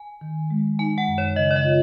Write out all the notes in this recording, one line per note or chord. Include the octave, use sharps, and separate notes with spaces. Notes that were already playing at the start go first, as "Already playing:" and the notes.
Already playing: G#5
D#3
G#3
D#4 G#5
F#5
F#2
C#5
C#3 D#5
C#5
D#5
F4